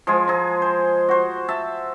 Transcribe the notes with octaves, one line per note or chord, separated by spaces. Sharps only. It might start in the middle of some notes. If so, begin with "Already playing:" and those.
F3 G#3 G#4
G#4 A#5
C5
F#4 C5
E5 A5